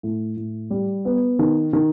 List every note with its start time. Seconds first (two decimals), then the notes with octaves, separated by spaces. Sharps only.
0.03 A2
0.37 A2
0.71 G3
1.05 B3
1.39 D#3
1.73 D#3